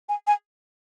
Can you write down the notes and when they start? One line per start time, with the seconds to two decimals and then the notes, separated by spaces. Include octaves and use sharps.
0.09 G#5
0.27 G#5